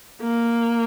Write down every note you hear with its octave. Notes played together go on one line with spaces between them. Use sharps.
A#3